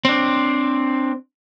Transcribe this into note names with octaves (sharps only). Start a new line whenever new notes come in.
C4 D4